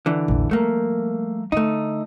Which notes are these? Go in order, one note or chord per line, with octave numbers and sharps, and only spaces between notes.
D3 E3
A#1 E2
F3 G3 A3 A#3
D3 A3 D#4